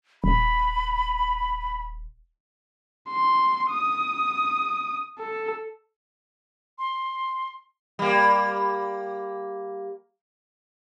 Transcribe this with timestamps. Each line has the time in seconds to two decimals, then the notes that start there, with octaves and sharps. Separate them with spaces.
0.24 D#1 B5
3.08 C6
3.71 D#6
5.19 A4
6.78 C6
7.99 G3 A#3